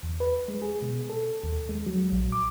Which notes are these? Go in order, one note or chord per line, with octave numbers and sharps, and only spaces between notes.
E2
B4
G#3
G#4
B2
A4
D#2
G#3
F#3
A#1
D6